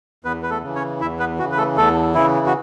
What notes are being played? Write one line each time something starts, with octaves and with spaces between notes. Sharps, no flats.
E2 B3 B4
B4
A3 A4
C#3 E3
C#4 C#5
E2 E4 E5
B3 B4
C#3 E3 F#4
B4
A3 A4
E2 A3 A4
C#3 E3 E4
F#4